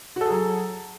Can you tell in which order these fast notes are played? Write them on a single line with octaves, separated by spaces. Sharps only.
F#4 A4 G#4 F#3